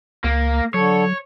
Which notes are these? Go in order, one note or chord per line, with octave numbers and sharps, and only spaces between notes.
C#2 A#3
D3 F#3 A4 C#5